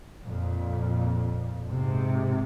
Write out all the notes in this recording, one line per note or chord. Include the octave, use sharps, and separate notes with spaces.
F2 A#2
G#2 C3